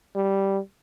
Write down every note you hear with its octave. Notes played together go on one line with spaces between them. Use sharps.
G3